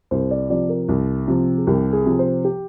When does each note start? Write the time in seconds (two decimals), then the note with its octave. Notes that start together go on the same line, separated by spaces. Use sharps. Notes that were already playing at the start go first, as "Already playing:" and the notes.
0.11 C2 C5
0.31 D5
0.50 C3 F3 D5
0.69 A#4
0.89 C2
1.28 C3 F3
1.58 G#4
1.67 C2 G4
1.93 G#4
2.06 C3 F3
2.19 C5
2.45 G4